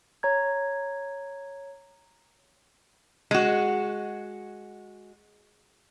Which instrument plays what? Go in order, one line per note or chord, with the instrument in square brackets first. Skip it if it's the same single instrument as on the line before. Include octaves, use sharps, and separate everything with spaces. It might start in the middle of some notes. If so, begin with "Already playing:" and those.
[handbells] C#5 A#5 G#6
[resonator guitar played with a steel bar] G#3 F#4